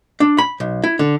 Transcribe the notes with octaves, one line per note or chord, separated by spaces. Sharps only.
D4
B5
B1
E4
D3